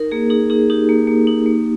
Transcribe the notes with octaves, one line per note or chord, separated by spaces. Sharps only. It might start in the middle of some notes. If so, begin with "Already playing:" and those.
Already playing: D#4 A#4
A#3 G#4
D#4 G#4
D#4 G#4
D#4 G4
A#3
A#3
D#4
A#3